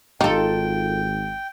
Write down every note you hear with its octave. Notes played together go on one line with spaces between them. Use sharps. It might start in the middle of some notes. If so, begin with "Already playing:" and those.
G#1 D#4 F4 G4 A4 G5